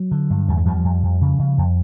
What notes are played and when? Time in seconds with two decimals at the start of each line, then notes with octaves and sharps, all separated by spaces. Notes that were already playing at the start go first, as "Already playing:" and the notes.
Already playing: F#3
0.11 D3
0.30 G2
0.48 E2 G3
0.57 G#3
0.66 E2 F3 G3
0.84 F2
1.03 F2
1.21 C#3
1.39 C#3
1.58 F2